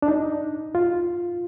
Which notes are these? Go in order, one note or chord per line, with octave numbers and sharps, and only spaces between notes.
D4
D#4
F4